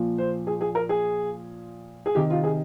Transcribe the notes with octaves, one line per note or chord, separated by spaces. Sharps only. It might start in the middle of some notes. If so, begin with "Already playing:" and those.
Already playing: A#2 F3
C5
G#4
G#4
A#4
G#4
G#4
C3 D#3 G4
F4
G#4